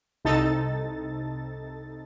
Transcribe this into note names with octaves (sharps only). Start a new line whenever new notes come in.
C2 C3 D#4 A4 A6